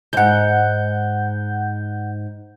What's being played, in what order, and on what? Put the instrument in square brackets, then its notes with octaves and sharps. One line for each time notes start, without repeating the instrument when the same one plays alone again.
[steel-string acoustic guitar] D#2 G#2 [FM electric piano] F#5 G6